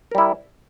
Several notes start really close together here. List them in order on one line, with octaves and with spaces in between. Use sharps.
A#4 G3 E4